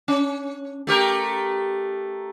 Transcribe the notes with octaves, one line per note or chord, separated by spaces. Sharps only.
C#4
A3 G4 A#4